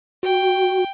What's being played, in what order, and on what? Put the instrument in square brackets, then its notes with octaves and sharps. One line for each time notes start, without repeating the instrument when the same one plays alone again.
[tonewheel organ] F#4 [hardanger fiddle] G5